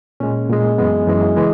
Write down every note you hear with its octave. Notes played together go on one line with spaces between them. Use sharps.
A#2 G#3 C#4
A#2 G#3
F#2 E3 G#3 B3
F#2 E3 G#3
C#3 E3 G#3